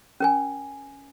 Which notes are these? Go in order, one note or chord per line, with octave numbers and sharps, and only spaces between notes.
C#4 A#4 G#5